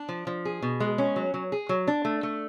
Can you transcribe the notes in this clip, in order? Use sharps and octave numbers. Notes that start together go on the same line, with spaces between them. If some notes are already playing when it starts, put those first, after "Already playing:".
Already playing: D4
F3
F3
G#4
B2
G#3
C#4
F#3
F#3
G#4
F#3
D4
A3
A3